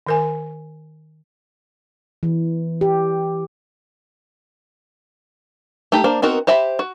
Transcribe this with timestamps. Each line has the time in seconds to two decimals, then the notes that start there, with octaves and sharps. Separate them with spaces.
0.07 D#3 A#4 G#5
2.23 E3
2.81 G4
5.92 A3 D#4 G4
6.04 A#3 D4 C5
6.22 B3 C4 D#4 F#4 A#4
6.47 G4 C5 E5 B5
6.79 F#4